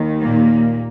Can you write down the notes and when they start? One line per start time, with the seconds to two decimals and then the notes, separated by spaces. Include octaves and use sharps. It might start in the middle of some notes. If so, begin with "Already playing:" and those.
Already playing: D#2 D#3
0.23 A#2 A#3